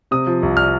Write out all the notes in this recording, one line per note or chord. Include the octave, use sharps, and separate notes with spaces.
C3 D#6
F3
C2
F6